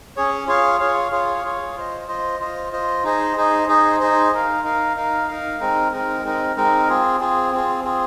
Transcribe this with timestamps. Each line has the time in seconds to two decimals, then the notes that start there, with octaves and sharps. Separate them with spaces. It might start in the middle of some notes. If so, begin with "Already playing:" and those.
0.16 C#4 G#4 C#5
0.47 F4 G#4 C#5 F5
0.80 F4 G#4 C#5 F5
1.12 F4 G#4 C#5 F5
1.44 F4 G#4 C#5 F5
1.76 F4 C5 D#5
2.07 F4 C5 D#5
2.40 F4 C5 D#5
2.72 F4 C5 D#5
3.04 D#4 G#4 C5 D#5
3.37 D#4 G#4 C5 D#5
3.68 D#4 G#4 C5 D#5
4.00 D#4 G#4 C5 D#5
4.32 D#4 A#4 F5
4.64 D#4 A#4 F5
4.96 D#4 A#4 F5
5.28 D#4 A#4 F5
5.60 G#3 C4 D#4 A#4
5.92 G#3 C4 D#4 A#4
6.24 G#3 C4 D#4 A#4
6.56 G#3 C4 D#4 A#4
6.89 C4 F4 G#4
7.20 C4 F4 G#4
7.52 C4 F4 G#4
7.84 C4 F4 G#4